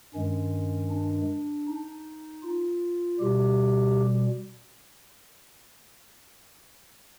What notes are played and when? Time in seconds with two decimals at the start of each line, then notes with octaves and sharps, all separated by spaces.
0.14 G2 D#3 G#3 C#4
0.91 D4
1.67 D#4
2.43 F4
3.19 B2 G3 G4